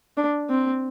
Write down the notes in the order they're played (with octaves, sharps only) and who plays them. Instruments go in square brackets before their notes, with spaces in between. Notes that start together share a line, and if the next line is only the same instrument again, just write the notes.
[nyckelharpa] D4
C4